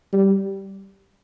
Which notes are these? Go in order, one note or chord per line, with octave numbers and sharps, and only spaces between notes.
G3